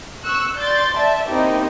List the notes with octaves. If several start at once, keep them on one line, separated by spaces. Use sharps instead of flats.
C#6 E6 F#6
D5 C6 G6 A6
D5 E5 A5
A#3 C4 D#4 E4 G4